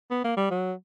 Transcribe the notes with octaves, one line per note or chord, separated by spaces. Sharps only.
B3
A#3
G3
F#3